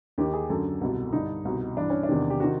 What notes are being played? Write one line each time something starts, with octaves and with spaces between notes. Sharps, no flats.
D#2 D#3 G4
G#4
F#2 D3 A4
C2 B2
G2 D3 D#4
C2 B2
G2 E3 D4
C#4
D4
E2 C3 D#3
G4
C3 D#3 F#4